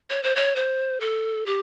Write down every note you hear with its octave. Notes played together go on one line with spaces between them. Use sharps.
C#5
C5
C#5
C5
A4
G4